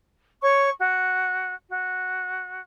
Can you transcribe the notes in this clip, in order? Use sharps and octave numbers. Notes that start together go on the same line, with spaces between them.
C#5 C#6
F#4
F#4